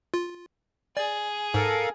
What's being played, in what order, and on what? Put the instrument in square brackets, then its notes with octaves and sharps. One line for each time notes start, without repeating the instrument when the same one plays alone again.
[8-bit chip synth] F4
[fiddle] G#4 [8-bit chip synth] D5
[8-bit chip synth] G#2 [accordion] A4 A#4 F5